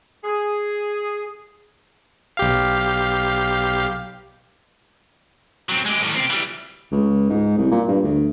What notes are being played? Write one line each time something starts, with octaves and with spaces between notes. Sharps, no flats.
G#4
B1 G4 F5
F#3 C4
G#3 G4
A2 D#3
C4 G4
E3 G3
C#2
G#2
C2
A#2
G2
D2